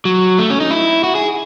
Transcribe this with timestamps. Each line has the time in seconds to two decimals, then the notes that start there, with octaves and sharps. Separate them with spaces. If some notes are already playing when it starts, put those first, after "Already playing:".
0.05 F#3
0.38 A3
0.50 C#4
0.60 D#4
0.71 E4
1.04 F#4
1.15 G#4